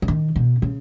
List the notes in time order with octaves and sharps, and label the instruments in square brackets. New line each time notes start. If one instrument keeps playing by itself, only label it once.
[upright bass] C#3
D#3
B2
C#3